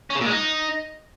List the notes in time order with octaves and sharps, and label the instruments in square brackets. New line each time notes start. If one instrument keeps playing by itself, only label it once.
[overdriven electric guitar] C#4
C#3
A#2
G#3
D#4